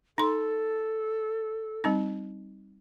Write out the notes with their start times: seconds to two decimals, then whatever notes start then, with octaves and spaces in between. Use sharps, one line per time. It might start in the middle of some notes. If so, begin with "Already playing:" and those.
0.18 D#4 A4 C6
1.84 G3 C4 D#4